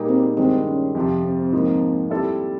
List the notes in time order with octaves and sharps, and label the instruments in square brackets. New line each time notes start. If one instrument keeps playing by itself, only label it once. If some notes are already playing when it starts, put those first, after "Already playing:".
Already playing: [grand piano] A#2 G3 A#3 D#4 G#4
[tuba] C4
[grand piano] G2 D#3 G#3 [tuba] C4
[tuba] C#4
[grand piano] F2 C3 F3
[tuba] C4
[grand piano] G#2 F3 A#3 D#4
G3 C4 E4 A4